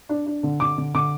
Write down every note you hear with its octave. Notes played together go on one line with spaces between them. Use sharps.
D4
D4
D3
D3 D6
D3
D3 D6